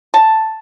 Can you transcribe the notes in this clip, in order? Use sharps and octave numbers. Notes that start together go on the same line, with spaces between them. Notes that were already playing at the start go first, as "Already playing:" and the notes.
A5